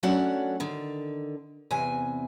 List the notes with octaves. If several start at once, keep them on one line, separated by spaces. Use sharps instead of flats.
F#3 A3 C#4 D4 F#4 F#5
D3 D#3
E2 C3 G#5